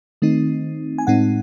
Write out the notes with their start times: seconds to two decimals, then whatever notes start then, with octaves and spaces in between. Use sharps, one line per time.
0.22 D#3 A3 C4 D#4
0.98 G#5
1.07 A2 G#3 C4 D#4 F#5